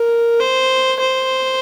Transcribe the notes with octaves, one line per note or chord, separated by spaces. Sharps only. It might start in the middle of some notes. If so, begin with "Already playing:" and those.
Already playing: A#4
C5
C5